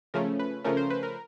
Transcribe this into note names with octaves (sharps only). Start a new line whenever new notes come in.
C#3 F3 A3 C#4 A#4
B4
C#3 F3 A3 C#4 A#4
C5
B4
A#4